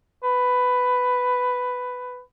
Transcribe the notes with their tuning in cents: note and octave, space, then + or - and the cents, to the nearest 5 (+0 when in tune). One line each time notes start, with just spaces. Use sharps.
B4 +10